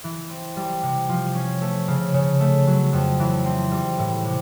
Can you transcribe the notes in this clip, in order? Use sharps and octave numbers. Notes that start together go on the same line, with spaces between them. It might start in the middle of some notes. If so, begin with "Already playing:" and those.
E3
C4
G3
C3
F3
C#4
A3
C#3
C#3
A3
F#3
F2
E3
C4
G3
A2
C3